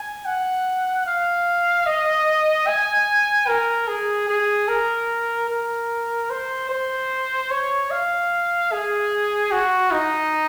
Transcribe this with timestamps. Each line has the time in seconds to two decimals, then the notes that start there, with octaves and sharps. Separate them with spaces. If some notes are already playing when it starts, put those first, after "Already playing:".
Already playing: G#5
0.25 F#5
1.06 F5
1.86 D#5
2.67 G#5
3.48 A#4
3.88 G#4
4.28 G#4
4.68 A#4
5.49 A#4
6.30 C5
6.70 C5
7.51 C#5
7.91 F5
8.72 G#4
9.52 F#4
9.92 D#4